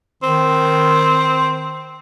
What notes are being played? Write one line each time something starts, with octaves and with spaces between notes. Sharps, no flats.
D#3 C4